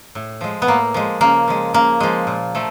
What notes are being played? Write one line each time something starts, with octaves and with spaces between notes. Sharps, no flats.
A2
F3 G#3
B3
A2 A#3
F3 G#3
C#3 A#3
F3 G#3
C#3 A#3
F3 G#3
A#2
F3 A3